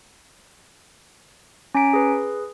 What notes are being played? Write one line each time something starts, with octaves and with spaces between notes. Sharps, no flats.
C#4 G#5 A#5 B6 D7
G#4 B4